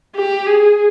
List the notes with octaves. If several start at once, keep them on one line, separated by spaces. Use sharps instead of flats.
G4
G#4